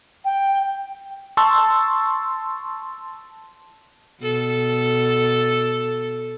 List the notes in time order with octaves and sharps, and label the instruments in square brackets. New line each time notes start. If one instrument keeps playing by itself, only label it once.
[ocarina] G5
[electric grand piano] A5 C6 C#6 E6
[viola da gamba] B2 A4